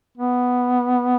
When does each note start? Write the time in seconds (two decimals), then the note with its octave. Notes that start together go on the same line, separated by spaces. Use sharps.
0.18 B3